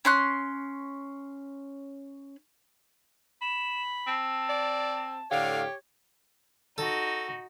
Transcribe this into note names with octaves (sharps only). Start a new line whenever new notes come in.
C#4 C6 F#6
B5 E7
C4 A5
D5
A2 D3 G4 C#5 F5
D#4 F#4 A4